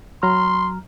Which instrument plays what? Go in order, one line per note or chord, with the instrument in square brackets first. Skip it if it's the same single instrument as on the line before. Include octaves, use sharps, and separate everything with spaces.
[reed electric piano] F#3 A#5 F6 [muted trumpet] C6